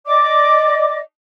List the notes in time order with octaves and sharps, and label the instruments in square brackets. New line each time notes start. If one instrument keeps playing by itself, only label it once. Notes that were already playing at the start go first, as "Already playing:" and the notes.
[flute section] D5 D#5 D6